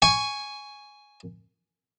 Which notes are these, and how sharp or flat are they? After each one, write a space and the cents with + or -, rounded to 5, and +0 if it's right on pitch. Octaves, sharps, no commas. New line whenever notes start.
G#5 +0 C#6 +10